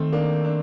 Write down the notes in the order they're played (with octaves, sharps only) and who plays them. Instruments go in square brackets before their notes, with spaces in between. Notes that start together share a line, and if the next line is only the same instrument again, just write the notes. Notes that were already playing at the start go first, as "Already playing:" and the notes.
Already playing: [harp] D#3 [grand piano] A3 C4
[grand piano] A#3 D4 [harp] D#4
[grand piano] D4